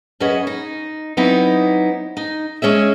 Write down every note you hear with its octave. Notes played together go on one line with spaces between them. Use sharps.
F#2 C#4 F#4 G#4 B4 D#5
D#4
F#3 B3 C4 D#4 E4 G4
D#4
G#3 C#4 G#4 E5